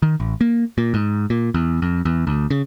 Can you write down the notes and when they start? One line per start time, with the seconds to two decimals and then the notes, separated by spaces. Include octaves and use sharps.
0.02 D#3
0.20 A1
0.41 A#3
0.78 A#2
0.94 G#2
1.30 A#2
1.54 E2
1.82 F2
2.05 E2
2.27 D2
2.50 C#3